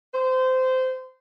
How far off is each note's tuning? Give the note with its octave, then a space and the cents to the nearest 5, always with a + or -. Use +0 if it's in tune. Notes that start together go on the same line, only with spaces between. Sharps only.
C5 -20